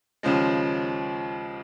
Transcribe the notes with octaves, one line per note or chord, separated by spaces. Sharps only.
D#2 C#3 F3 G#3